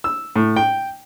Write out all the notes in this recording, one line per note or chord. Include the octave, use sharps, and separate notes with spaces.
E6
A2
G5